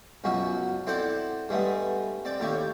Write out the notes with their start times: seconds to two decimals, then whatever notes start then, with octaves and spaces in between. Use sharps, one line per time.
0.24 C#2 F#2 B2 F#4
0.87 C4 E4 A4 C5 D5 F#5
1.49 G2 G#3 A3 B3
2.25 C4 D5
2.40 D#2 A2 G4 C#6